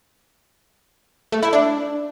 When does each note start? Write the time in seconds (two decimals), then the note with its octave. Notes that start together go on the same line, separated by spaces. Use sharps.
1.32 A3
1.43 E4
1.53 D4